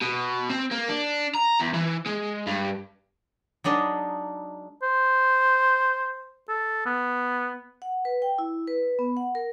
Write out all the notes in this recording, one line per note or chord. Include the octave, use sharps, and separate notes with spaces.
B2
C4
A#3
D4
A#5
E2
E3
G#3
G2
F#3 G#3 D4 D#4
C5
A4
B3
F#5
B4
G5
E4
B4
B3
F#5
A#4